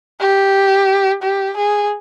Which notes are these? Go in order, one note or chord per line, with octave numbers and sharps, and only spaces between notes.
G4
G4
G#4